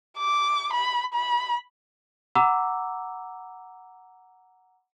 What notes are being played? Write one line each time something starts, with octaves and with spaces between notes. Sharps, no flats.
D6
B5
B5
F#5 A#5 B5 D6 E6